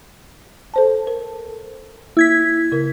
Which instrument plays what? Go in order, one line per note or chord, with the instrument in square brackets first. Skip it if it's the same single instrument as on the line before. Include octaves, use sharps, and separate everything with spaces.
[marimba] A4 C5 A5
A#4
[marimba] A#3 [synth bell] E4 G#6 B6
[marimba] C#3 A#4